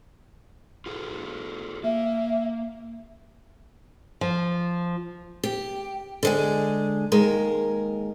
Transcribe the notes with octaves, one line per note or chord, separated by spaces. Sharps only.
F4 G#4 A4
A#3 E5
F3
G4
D3 G#3 G#4
D#2 G#3 A#4